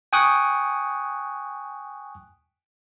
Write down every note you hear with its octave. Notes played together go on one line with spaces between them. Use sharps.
G5 G#5 C#6 D#6 F#6